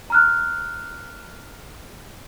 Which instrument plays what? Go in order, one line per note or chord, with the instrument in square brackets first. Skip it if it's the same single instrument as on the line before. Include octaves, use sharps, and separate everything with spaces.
[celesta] A#5 F6 F#6